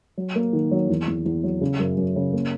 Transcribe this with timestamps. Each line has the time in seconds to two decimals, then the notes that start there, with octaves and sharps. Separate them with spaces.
0.17 F#3
0.36 A#3
0.53 D#3
0.71 F#3
0.89 E2
1.08 E2
1.26 E2
1.44 F#3
1.61 C#3
1.79 F#2
1.97 F#2
2.16 C#3
2.33 A#3